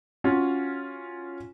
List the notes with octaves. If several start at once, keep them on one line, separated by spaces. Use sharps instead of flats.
C#4 F4 F#4